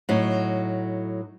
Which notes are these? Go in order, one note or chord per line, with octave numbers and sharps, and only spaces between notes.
A2 F#3 D#4